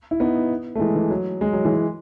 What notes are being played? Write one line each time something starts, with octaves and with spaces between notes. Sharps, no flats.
E4
B3 D#4
A3
E3 G#3
E3
F#3
G#3
F#3
E3 G#3